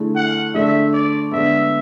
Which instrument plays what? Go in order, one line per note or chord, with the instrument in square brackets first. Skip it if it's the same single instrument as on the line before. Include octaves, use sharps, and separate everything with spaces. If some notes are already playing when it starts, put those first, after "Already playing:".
Already playing: [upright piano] D3 A3 E4 G#4
[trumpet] F#5
[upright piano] D3 A3 D4 G#4 [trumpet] E5
[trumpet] D5
[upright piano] D3 G#3 B3 [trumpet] E5